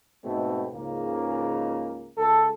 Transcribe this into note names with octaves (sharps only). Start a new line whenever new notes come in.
G#2 B2 A3 C4
C#2 G#2 C#3 A#3
C#2 A4